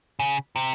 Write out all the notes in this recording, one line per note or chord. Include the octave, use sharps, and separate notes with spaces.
C#3
C3